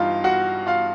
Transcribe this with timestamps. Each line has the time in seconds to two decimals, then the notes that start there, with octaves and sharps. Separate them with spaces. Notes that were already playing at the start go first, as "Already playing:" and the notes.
Already playing: G2 E3 G3 D#4 F4 F5
0.24 F#4 F#5
0.67 F4 F5